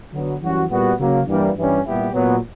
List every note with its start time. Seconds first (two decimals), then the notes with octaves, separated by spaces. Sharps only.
0.12 D3 F#3 B3
0.41 F#2 E3 G3 C#4 F#4
0.69 A#2 G3 B3 F#4
0.98 C#3 F#3 A#3
1.27 G2 E3 G3 A#3
1.56 G2 E3 G3 C#4
1.85 A#2 G3 B3 E4 G4
2.14 A#2 F#3 B3